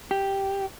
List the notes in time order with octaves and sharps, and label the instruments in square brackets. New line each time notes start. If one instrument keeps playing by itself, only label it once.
[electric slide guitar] G4